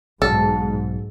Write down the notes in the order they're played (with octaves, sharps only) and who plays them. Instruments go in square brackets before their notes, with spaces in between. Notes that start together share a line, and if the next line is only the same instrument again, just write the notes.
[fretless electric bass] B1 [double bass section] G#2 [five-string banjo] A4